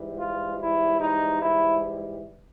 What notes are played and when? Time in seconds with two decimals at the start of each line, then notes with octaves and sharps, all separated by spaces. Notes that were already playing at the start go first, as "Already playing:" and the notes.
Already playing: G#2 E3 G3
0.19 F4
0.60 E4
1.01 D#4
1.42 E4